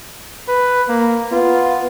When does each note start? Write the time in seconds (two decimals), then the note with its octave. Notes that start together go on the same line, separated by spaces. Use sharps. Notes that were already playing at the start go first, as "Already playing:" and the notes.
0.48 B4
0.89 A#3
1.32 B3 F4